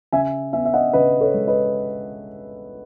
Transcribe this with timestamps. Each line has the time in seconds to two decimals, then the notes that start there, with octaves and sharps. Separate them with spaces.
0.13 C#3 E5 G#5
0.53 B3 E5 G#5
0.65 E5
0.74 D#5 F#5
0.93 C#3 B4 D#5
1.21 A4 C#5
1.34 G#3
1.47 B4 D#5